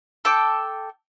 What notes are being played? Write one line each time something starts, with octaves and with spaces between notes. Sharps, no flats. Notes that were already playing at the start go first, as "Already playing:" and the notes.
A4 G5 D6